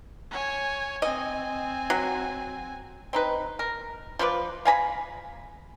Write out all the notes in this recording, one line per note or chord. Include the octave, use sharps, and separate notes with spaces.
C#5 G#5
C4 D#5 G#5
F#3
C4 D#4 B4
A#4
F3 F4 B4 D5
F5 G#5 A#5 B5